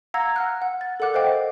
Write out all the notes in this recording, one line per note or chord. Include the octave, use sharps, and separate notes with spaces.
F5 F#5 A#5 E6 G#6 A#6
F#5 F6 F#6
F#5
A6
A4 A#4 D5 F#5 D6 F#6
C5 D#5 F5 G5 D6